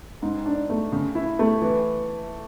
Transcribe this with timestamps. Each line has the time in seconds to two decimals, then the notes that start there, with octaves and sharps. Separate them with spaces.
0.22 G#2
0.46 D4
0.70 A3
0.92 C#3
1.15 E4
1.39 A3
1.62 E3